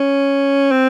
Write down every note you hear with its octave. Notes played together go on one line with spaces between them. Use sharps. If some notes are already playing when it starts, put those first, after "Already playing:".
Already playing: C#4
C4